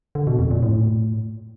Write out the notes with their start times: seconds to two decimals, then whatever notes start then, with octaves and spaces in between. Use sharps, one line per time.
0.15 D3
0.27 B2
0.39 F2
0.51 A#2
0.63 A2